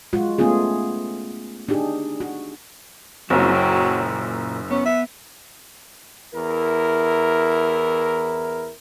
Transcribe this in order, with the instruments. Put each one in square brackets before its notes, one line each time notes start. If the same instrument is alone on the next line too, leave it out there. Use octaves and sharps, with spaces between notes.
[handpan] G#3 F4 F#4
A3 B3 C#4 F4 G#4
D4 D#4 G4 G#4
F#4
[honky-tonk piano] F#1 F#2 [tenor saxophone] F#3 [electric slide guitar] C4 E4 F4
[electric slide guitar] A#2 G5
[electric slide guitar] B3 [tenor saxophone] C#4
[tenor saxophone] E5
[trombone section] E2 E4 A#4